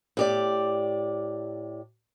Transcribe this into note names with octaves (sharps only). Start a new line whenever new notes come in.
A2 G4 D5